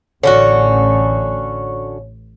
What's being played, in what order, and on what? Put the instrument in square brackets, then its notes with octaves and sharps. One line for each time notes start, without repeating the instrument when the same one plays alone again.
[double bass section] A1 [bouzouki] D3 C#4 F#4 [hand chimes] C#5